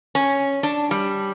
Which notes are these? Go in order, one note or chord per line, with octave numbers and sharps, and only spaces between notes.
C#4
D4
G3